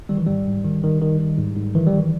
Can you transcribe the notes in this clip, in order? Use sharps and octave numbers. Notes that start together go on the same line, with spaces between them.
D#3 G3
E3
G#2 G3
G#2
D#3
D#3
D#3
D#3
G#2
G#2
D#3 E3
G3
D#3 E3